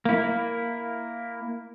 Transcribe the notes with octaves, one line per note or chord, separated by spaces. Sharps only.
A#3 E4